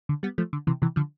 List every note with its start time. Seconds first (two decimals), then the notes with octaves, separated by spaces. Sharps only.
0.09 D3
0.23 G3 B3
0.38 F3 A3
0.53 D3
0.67 C3 E3
0.82 C3 E3
0.96 D3 F3